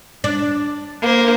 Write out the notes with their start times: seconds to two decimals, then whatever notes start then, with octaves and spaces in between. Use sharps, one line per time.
0.24 D4
1.02 A#3 C5